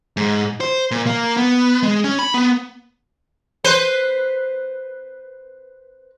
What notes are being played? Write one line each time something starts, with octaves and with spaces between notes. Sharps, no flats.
G#2
C5
A#2
A#3
B3
G#3
C#4
B5
B3
B4 C5